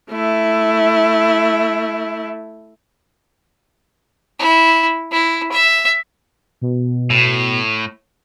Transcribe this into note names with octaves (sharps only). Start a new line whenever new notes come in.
A3 E4
E4
E4
E5
B2
A2